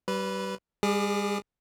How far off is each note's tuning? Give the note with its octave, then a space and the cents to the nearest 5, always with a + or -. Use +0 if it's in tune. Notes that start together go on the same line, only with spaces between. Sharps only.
G3 -30 B4 +0
G3 +40 G#4 +0 D6 +30